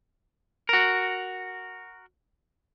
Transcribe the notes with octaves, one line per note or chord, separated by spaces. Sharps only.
F#4 A#4